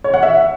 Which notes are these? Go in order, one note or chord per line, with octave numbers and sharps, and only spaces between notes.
C#5
F#5
E5